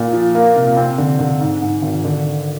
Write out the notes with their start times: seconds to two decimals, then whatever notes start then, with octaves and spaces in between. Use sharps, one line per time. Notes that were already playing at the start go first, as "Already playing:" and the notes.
Already playing: A#2
0.13 F3
0.35 A#3
0.55 C3
0.77 C4
0.98 D3
1.19 D3
1.40 G#2
1.62 G#2
1.82 G#1
2.05 D3